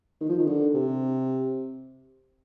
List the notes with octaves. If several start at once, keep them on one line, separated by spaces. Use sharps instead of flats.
D#3
F3
D#3
D3
C3